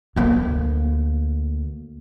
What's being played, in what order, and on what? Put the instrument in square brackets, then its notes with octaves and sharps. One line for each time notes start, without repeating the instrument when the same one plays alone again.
[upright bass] D2 A#3